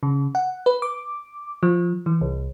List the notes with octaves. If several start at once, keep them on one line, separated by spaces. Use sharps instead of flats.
C#3
F#5
B4
D6
F3
E3
C2